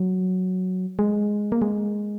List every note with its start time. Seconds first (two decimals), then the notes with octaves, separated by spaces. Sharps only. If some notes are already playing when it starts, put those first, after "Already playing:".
Already playing: F#3
0.99 G#3
1.52 A#3
1.62 G#3